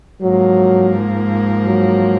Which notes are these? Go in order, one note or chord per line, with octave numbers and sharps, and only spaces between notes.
G#2 F3 F#3 A#3
F#3